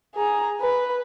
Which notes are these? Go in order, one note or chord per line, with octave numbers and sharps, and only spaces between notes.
G#4 A#5
B4